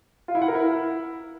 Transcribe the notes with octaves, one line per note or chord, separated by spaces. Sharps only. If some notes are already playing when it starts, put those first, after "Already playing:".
F4
E4
F#5
A#4
E4